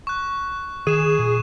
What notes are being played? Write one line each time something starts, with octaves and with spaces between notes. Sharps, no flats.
C#6 F#6
D#3 G#4 D#7 E7
A#2